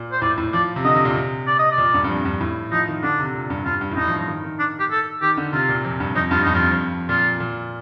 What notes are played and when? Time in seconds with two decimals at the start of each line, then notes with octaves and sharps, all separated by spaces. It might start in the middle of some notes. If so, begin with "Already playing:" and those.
Already playing: A#2
0.12 C5
0.22 A2 D5
0.38 A2
0.53 F3 D5
0.76 C3
0.84 D3 D#5
0.95 C3
1.05 A#2
1.16 C3
1.47 D5
1.59 D#5
1.71 D5
1.78 A#2
1.94 G2
2.04 G2
2.09 F2
2.25 G2
2.41 A2
2.72 F3 D#4
2.88 D#3
3.03 D3 D4
3.19 C3
3.34 A#2
3.50 G2
3.65 G2 F4
3.81 G2
3.91 A2
3.97 G2 D#4
4.08 F3
4.18 F3
4.28 D#3
4.44 D#3
4.59 D4
4.80 G4
4.90 A4
5.22 D#3 G4
5.37 D3
5.53 C3 F4
5.69 A#2
5.85 F2
6.00 G2
6.15 F2 D#4
6.31 G2 F4
6.43 G2 D#4
6.55 F2 F4
6.72 F2
7.09 A#2 F4
7.40 A#2